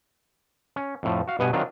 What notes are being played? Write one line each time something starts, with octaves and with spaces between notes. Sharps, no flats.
C#4
F2 A2 F3
F#4 F5
G2 B2 B3 D#5 G#5
D#3 F#3 C4 D4 F4